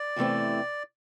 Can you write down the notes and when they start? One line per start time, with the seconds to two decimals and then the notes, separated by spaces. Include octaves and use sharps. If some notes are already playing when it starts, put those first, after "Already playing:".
Already playing: D5
0.16 E2 C3 E3 A3 C4